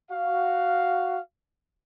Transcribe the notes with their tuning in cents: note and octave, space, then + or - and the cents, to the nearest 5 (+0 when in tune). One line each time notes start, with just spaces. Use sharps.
F#4 +5 F5 +0